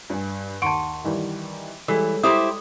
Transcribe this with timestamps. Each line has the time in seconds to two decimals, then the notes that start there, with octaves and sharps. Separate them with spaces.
0.10 G2 G#5
0.62 D#2 F#5 A5 C6 C#6 D7
1.04 D#3 E3 G3
1.88 E3 G3 G#3 A4 C#5
2.23 E4 G4 C5 D#6